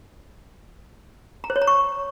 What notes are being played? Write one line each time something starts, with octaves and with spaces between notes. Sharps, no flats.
A#5
C5
C#5
A#5
C#6